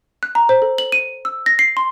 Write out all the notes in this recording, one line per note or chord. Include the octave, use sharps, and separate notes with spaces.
F#6
A#5
C5
A4
F#7
D#7
E6
A#6
C7
C6